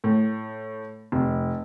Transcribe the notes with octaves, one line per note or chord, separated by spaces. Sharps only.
A2
F1